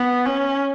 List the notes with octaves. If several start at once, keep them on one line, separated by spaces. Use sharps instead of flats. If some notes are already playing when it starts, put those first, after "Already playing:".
Already playing: B3
C#4